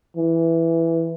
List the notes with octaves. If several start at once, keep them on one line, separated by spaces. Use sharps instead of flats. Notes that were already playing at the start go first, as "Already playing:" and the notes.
E3